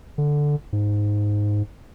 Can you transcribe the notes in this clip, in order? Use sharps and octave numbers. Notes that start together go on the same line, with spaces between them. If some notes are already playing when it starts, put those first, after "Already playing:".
D3
G#2